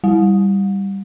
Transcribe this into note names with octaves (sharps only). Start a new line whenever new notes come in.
G3